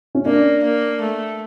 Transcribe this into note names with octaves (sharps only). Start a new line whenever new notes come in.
C#4
A#3 D4
A#3
A3